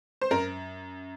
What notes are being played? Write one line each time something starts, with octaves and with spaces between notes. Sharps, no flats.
C5
F#2 A#4